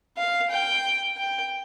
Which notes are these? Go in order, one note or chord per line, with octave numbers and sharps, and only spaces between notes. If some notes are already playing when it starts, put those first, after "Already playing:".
F5
G5
G5